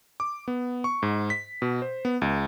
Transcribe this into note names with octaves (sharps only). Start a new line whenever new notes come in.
D6
B3
C#6
G#2
B6
B2
C5
B3
C#2